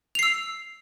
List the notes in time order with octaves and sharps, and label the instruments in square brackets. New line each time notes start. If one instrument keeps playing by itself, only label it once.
[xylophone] F7
C7
E6